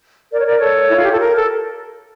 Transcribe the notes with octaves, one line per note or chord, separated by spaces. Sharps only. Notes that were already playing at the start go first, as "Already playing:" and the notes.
A#4 D5
C#5
A#4 D5
A4 C#5
E4
F4
G4
A4
A#4
A4